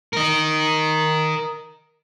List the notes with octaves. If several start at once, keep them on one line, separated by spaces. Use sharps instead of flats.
A#4 D#5